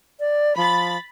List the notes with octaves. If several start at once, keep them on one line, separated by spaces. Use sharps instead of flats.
D5
F3 B5 A6